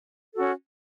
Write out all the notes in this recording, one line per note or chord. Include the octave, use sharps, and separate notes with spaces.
C#4 F#4 A4